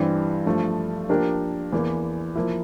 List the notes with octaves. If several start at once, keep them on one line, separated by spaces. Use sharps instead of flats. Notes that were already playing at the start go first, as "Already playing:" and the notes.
Already playing: G2 E3 G3 C4
G2 F3 A3
F3 A#3 D4 G4 A#4
E2 E3 A#3
F3 A#3 E4